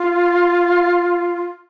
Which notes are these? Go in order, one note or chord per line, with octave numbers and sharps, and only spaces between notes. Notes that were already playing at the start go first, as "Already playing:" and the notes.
Already playing: F4